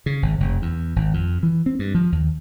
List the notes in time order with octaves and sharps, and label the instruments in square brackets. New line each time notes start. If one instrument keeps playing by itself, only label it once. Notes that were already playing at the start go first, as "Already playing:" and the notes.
[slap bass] C#3
G#1
F1
E2
G#1
F2
E3
C4
G2
F3
D#2